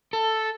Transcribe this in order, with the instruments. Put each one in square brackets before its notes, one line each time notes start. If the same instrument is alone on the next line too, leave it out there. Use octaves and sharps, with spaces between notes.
[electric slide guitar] A4